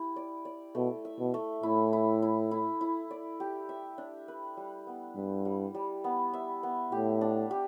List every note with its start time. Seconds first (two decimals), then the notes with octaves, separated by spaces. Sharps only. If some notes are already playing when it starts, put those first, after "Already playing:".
Already playing: E4 G4
0.16 D5
0.45 D5
0.75 B2 A3
1.05 E5
1.19 B2
1.34 A3
1.63 A2 E4
1.93 E4
2.22 E4
2.51 E4
2.81 E4
3.11 D5
3.40 G4
3.69 E5
3.98 D4
4.28 B4
4.57 G3
4.87 B3
5.16 G2 E4
5.45 G3
5.75 G3
6.04 B3
6.34 E5
6.63 B3
6.92 A2 G4
7.21 D4
7.51 G4